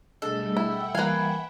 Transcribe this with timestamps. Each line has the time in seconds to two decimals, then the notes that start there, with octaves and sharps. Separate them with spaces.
0.22 B2 G3 A3 D4 G#4 A4 D#5
0.57 E4 E5 F#5 G5
0.95 E3 G3 A#3 B4 F5 G#5